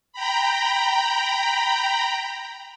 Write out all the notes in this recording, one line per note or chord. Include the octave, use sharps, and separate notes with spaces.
G5 A#5 B5